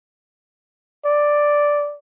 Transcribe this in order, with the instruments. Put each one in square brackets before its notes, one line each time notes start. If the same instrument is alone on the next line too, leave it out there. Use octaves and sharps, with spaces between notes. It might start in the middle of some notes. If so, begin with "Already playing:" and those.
[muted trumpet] D5